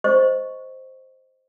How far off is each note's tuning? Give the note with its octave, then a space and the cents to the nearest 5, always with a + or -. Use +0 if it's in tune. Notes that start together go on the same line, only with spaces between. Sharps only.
C5 +0 D#5 +5 C#6 +0